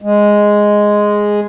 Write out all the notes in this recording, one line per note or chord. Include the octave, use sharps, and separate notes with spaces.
G#3